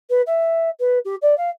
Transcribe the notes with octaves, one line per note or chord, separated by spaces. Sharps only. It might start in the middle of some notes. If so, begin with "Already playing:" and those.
B4
E5
B4
G4
D5
F5